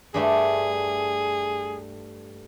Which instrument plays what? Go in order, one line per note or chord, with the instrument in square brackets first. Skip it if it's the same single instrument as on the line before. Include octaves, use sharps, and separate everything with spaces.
[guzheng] G2 G3 A3 [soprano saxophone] G#4